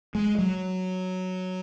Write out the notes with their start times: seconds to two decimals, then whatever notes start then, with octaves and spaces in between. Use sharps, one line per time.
0.15 G#3
0.38 F#3